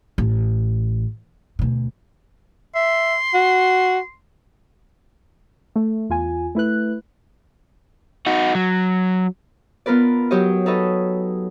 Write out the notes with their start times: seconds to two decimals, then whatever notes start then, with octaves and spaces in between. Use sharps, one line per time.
0.18 A1
1.59 D2 B2
2.75 E5 C6
3.34 F#4
5.76 A3
6.09 E2 F4 G#5
6.55 A3 E4 B4 F#6
8.26 D#4 F#4
8.55 F#3
9.86 B3 F4 A#4 B4 D5
10.31 F#3 G4 C#5 D#5
10.66 D#4 A4 B4 C#5 D#5